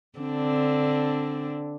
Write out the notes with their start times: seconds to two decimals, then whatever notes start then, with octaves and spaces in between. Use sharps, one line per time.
0.19 D3 C4 D4